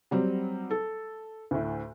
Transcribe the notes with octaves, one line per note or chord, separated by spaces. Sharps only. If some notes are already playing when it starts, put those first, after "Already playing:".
F#3 G3 C4
A4
D2 A2